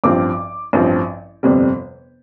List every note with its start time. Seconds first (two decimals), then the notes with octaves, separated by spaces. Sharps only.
0.04 A1 G2 F3 C4 D6
0.73 A1 G2 F3 C4
1.43 G1 F2 C3 G3